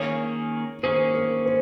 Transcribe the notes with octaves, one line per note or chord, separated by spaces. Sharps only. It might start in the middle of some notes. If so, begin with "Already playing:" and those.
Already playing: D#3 A#3 C#4 G#4 C#5
D#3 A#3 C#4 G#4 C5
A#4
C5